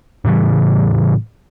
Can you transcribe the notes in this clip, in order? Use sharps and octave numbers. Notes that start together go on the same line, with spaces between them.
A2 C#3 E3 G3